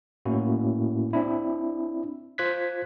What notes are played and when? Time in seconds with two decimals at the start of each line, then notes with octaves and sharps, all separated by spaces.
0.25 A2 A#3 C#4 E4 F#4
1.13 C4 D4 E4
2.38 F4 C5 F#6 G#6 B6